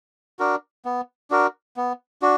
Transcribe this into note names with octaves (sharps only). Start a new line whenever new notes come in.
D4 F#4 A#4
B3
D4 F#4 A#4
B3
D4 F#4